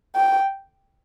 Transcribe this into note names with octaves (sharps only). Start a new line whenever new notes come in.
G5